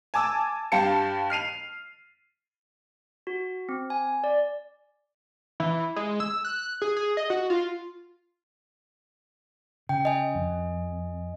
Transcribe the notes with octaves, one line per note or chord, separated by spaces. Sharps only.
G#5 A5 D6 E6
G2 G4 F5 A5 C#7
F6 C7 D#7 F7
F#4
C4
G#5
D5
E3
G#3
E6
F#6
G#4
G#4
D#5
F#4
F4
C#3 G5
D#5 G#5
F2